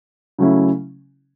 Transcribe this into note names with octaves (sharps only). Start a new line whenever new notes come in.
C#3 F#3 A3 C#4 E4